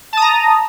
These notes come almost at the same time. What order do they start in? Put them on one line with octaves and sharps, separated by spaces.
A5 D#6 A#5